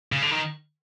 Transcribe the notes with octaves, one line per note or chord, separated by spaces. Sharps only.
C#3
D3
D#3